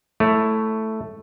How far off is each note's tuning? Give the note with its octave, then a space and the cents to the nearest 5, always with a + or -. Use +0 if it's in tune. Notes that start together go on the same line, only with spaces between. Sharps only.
A3 +0 E4 +0 C#5 +0